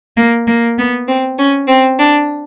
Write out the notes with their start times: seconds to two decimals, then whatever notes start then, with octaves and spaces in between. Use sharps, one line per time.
0.16 A#3
0.47 A#3
0.77 B3
1.08 C4
1.38 C#4
1.69 C4
1.99 D4